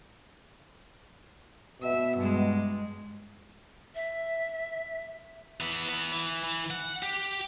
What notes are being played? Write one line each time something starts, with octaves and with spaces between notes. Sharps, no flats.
B2 E5
G2 G#3
E5
E3 B3
E3 B3
E3
E3
F#5
G4